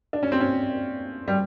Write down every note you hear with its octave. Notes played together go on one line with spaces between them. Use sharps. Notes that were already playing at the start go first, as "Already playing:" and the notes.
D4
C#4
C4
C#4
G3